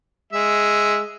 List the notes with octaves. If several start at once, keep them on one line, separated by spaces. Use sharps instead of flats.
G#3 E5